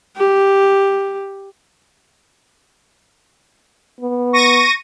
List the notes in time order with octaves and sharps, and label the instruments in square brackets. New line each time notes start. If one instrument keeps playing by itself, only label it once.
[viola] G4
[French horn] B3
[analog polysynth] C#6 A#6 D#7